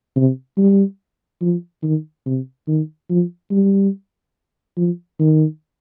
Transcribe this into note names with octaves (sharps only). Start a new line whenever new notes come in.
C3
G3
F3
D#3
C3
D#3
F3
G3
F3
D#3